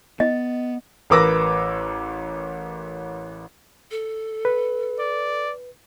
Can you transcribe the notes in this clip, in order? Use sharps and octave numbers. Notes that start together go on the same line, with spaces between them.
B3 D#5
A1 A#4 B4 D6 E6 A#6
A4
B4
D5